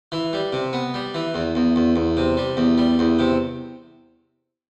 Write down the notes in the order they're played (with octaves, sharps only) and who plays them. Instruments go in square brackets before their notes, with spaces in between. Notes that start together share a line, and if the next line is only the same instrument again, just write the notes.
[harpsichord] E3
G3
C3
B3
G3
E3
E2
E2
E2
E2
C3
G3
E2
G3
E2
C3